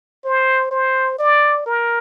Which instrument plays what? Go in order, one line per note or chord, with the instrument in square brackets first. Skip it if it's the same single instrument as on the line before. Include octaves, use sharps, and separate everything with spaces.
[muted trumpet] C5
C5
D5
A#4